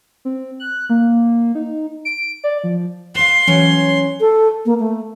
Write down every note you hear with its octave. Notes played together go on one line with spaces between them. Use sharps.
C4
F#6
A#3
D#4
D7
D5
F3
B4 F5 C6
E3 F#3 C#4
A4
A#3
A3